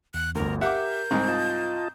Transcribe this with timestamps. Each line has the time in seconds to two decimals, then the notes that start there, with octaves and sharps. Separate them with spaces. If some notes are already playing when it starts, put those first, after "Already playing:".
0.14 E2 F#6
0.35 G1 D2 A#4
0.61 G4 A#4 E5 F#5 D6 G6
1.11 C2 G#2 C4 A#5 D#6
1.28 F4 D#5 A5